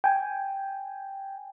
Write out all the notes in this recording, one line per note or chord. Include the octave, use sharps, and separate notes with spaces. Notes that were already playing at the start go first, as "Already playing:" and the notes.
G5 G#5